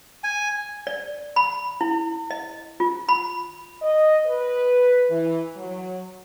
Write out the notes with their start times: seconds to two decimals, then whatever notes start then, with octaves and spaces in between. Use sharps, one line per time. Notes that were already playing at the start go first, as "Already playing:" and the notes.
0.24 G#5
0.87 D5
1.36 B5
1.81 E4
2.31 D#5
2.80 F4
3.09 B5
3.82 D#5
4.26 B4
5.10 E3
5.56 F#3